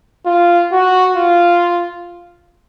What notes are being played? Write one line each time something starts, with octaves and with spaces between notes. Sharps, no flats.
F4
F#4
F4